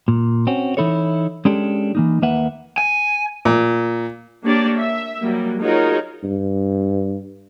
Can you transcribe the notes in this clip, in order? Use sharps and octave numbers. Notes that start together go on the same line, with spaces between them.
A#2
C4 C#4 F#4
E3 D#4 E4 A4 C#5
G#3 C#4 D4 G4 A4
E3 A#3 D#4
D#2 A#3 B4 E5 F#5
G#5
A#2
A#3 D4 G4 C#5 D5
E5
F#3 G3 A#3
D#4 F4 F#4 G#4 A#4 C#5
G2